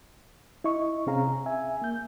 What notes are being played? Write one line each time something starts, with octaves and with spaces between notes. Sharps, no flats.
E4 D#5 C#6
C3 C4 C#4 G#4 F5 A#5
E5 G#5
A#3 G6